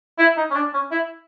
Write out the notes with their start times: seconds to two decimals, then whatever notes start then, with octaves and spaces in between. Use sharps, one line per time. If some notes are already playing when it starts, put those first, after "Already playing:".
0.19 E4
0.37 D#4
0.50 C#4
0.55 D4
0.73 C#4
0.91 E4